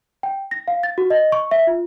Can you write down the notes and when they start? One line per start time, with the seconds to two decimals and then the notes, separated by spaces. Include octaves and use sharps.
0.23 G5
0.51 A#6
0.68 F5
0.83 A6
0.98 F#4
1.10 D#5
1.32 C#6
1.51 E5
1.67 F4